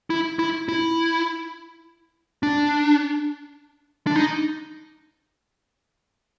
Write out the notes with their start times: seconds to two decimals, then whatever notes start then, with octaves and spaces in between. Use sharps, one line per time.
0.10 E4
0.39 E4
0.68 E4
2.43 D4
4.07 D4
4.16 D#4